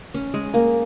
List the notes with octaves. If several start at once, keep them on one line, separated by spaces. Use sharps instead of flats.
C#4
G#3
A#3